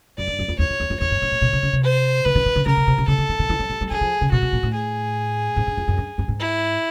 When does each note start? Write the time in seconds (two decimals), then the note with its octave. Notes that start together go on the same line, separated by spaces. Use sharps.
0.18 F#2 D5
0.28 G2
0.39 F#2
0.48 F2
0.59 E2 C#5
0.69 F2
0.80 E2
0.90 F2
1.00 E2 C#5
1.11 G2
1.22 G#2
1.32 A#2
1.42 B2
1.53 C3
1.63 C#3
1.73 C3
1.84 C5
2.25 D3 B4
2.35 D#3
2.46 D#3
2.56 D3
2.66 C#3 A#4
2.77 C3
2.87 C3
2.98 C3
3.08 C#3 A4
3.18 D3
3.29 D#3
3.39 D#3
3.50 E3
3.59 F#3
3.70 G3
3.81 G3
3.90 F#3 G#4
4.01 F3
4.21 C#3
4.32 B2 F#4
4.42 B2
4.53 A#2
4.63 A2
4.74 G#4
5.56 G#2
5.67 G2
5.77 F2
5.88 F#2
5.98 G2
6.18 G2
6.28 G#2
6.40 E4